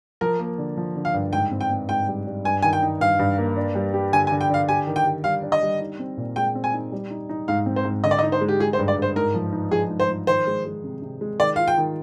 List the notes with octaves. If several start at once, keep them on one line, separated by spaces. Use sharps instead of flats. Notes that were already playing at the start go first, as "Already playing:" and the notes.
F3 A#4
A#3
D3
F3
D3
F5
G2
G#2 G5
C4
G5
C4
G#2 G5
G3
G3
G2 G#5
D#3 G#5
G5
D#4
G2 F5
G2
A#3
D4
G3
G4
D3 G#5
G#5
D3
G5
D3 F5
G4 G#5
D#3
G5
G4
G3 F5
D4
D#5
G3
D#4
C4
A#2
G#3 G5
C4
G#5
D#4
G3
D#4
D#4
G#2 F5
C4
C5
G#2
D3 D#5
D5
D#5
D#4
C5
G#3
G4
G#3 G#4
C5
G2
D5
G2 C5
G#2 A#4
F3
D#4
F3 G#4
G#2
C5
F3
D#3 C5
G#3
G#3
C3
C3
G#3
D#3 D5
F4 F5
G5
D#3